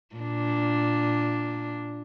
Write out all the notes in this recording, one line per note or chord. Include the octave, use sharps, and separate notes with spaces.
A#2 D4